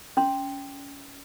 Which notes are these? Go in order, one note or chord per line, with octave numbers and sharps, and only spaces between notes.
C#4 C6